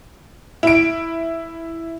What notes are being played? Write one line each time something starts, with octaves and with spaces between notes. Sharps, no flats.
E4 D7